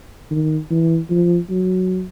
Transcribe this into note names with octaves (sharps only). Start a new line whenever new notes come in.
D#3
E3
F3
F#3